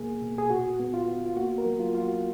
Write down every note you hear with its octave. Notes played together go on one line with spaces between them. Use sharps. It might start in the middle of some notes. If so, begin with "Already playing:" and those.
Already playing: B2 A#3 G#4
B2
G#4
A#2 F#4
B3
F4
B3
F4
A#3 F#4
A#4
F#3
F4
A#3 F4
F#4